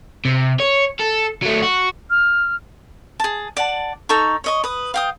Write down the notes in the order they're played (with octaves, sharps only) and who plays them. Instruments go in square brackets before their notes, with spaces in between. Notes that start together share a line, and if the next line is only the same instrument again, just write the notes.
[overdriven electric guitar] C3
C#5
A4
F#3 A3
F#4
[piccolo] F6
[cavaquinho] G#4 A5
D5 F#5 A5
D#4 A4 A#5 C#6
C#5 D#5 C#6
B4 D#6
F5 G5 D#6